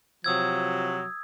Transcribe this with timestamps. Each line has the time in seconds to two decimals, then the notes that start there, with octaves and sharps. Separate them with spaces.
0.24 C3 F3 F#3 D#6 E6 G#6